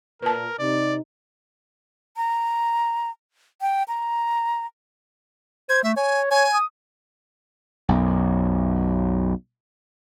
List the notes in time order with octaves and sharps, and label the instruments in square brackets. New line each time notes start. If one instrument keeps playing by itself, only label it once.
[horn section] A#2 [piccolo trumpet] A#4 [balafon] B4 A5
[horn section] C3 D#4 [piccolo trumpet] D5
[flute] A#5
G5
A#5
[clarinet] C5 [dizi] G#6
[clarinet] A3 [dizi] E5
[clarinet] C#5 [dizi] G#5
[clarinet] C#5 [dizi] G#5
[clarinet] D#6
[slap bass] B1 F#2